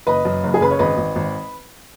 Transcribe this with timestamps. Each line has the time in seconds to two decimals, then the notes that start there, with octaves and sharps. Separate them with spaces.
0.07 F#1 B4 D#5
0.25 F#2
0.44 F#1
0.54 G#4
0.61 C#3 B4
0.71 C#5
0.79 G#1 B4 D#5
0.97 G#1
1.16 G#1